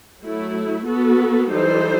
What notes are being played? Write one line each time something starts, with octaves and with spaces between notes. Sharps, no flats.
F#3 A3 E4
B3 F#4 A4
E3 G3 D#4 A4 C5